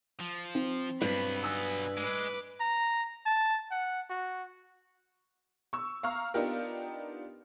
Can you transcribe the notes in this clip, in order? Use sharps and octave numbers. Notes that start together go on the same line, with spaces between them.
F3
C4
G2 F#3 B3 B5
B4 G#5 D#6 E6
G#3 B4 D6
A#5
A5
F#5
F#4
C#6 E6
F5 A#5 C#6 F6
B3 D4 D#4 F4 G4 A#4